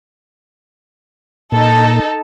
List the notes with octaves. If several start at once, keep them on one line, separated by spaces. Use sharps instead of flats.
A#2 D#4 A4